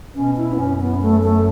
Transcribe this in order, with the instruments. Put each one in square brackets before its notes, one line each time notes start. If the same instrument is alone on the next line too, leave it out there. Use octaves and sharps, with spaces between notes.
[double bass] B2 [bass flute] C#4
[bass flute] E4
B3
[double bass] F#2 [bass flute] C#4
[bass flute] B3
A3
A3